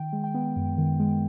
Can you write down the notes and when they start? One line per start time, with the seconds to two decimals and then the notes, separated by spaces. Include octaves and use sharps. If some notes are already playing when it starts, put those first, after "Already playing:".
Already playing: D#3 G5
0.13 G#3
0.24 G5
0.34 B3
0.56 F#2
0.78 D#3
1.00 G#3